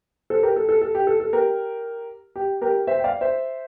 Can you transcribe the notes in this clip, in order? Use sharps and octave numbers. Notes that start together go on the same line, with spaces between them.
A4 C5
G4 A#4
A4
A4
A4
G4
A4
A4
G4 A#4
G4
G4 A#4
C5 E5
G5
D5 F5
C5 E5